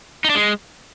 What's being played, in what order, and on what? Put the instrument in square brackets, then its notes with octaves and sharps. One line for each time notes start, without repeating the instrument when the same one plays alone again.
[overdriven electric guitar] D#4
D4
G#3